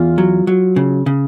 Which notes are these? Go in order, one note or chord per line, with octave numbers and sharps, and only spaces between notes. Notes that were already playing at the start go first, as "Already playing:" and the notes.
Already playing: E2 F4
F#3
F#3
C#3
C#3